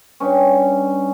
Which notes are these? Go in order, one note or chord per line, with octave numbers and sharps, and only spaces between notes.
G2 C#4